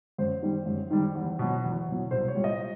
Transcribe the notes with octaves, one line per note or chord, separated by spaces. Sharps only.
F#2 C5
D#3 G3
F#2
D#3 G3
E2
B2 F#3
E2
B2 F#3
C2 C5
C#5
A#2 G3
D#5